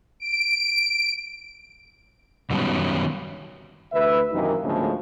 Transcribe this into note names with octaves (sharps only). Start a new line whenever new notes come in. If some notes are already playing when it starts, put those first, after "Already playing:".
D7
F#2 D#3 F#3 G3 B3 C#4
D2 B4 E5
F#2 C3 D#3 E3 A#3 D#4
D2 A2 C#3 F3 G#3 A#3